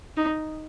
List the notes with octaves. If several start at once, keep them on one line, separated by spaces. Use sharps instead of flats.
D#4